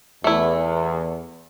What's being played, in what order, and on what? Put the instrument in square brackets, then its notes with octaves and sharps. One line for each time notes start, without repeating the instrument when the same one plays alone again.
[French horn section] E2 [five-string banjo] A3 E4